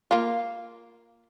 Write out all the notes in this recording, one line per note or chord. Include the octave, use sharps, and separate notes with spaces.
A#3 F4